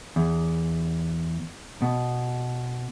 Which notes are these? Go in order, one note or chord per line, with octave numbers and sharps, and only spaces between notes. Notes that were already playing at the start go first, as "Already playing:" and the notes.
E2
B2